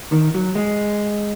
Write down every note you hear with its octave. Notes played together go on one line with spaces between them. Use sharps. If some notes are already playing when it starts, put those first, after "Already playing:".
D#3
F#3
G#3